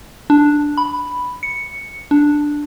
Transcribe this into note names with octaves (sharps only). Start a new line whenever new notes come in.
D4
B5
C#7
D4